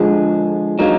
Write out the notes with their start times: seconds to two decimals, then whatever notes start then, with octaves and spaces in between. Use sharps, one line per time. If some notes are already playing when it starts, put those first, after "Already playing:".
Already playing: D3 F3 G#3
0.79 D3 F#3 A#3 D#4